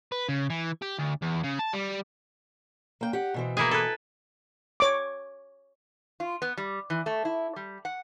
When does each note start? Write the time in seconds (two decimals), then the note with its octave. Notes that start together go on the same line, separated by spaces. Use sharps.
0.12 B4
0.29 C#3
0.50 E3
0.82 G4
0.99 D2
1.22 E2
1.44 C#3
1.59 A5
1.73 G3
3.01 A#3 G5
3.13 G4 F#5
3.34 B2 E3 C4
3.57 A#3 E4 G#4
3.71 A4 B4
4.80 C#5 D6
6.20 F4
6.42 B3
6.58 G3
6.90 E3
7.06 A3
7.25 E4
7.56 G3
7.85 F#5